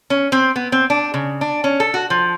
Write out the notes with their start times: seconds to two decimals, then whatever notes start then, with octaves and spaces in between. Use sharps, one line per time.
0.10 C#4
0.32 C4
0.56 B3
0.72 C4
0.90 D4
1.14 C#3
1.41 D4
1.64 C#4
1.80 A4
1.94 F#4
2.10 F3